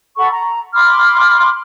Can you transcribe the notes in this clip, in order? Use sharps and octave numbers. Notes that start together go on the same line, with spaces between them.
A4 F#5 B5 C#6
A#5
B5 C6 D6 F6